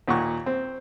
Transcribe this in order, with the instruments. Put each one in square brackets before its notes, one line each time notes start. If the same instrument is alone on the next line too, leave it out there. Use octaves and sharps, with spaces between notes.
[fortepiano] D#2 A#2 F#5 C#6
C4